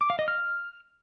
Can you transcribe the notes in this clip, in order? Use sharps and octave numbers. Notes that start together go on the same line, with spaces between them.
D6
F5
D#5
F6